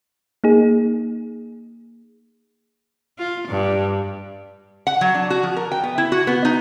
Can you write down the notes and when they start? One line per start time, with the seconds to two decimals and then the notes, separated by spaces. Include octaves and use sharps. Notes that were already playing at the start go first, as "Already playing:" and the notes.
0.44 A#3 D#4 G#4
3.18 F4
3.48 G2
4.87 F#5
5.01 F#3
5.14 D4
5.30 F#4
5.43 F3
5.57 A#4
5.72 G5
5.83 B3
5.98 E4
6.12 F#4
6.27 B3
6.45 D#4